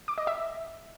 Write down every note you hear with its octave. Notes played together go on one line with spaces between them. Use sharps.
D6
D#5
E5